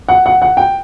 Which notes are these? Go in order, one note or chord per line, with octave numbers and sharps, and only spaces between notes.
F#5
F#5
F#5
G5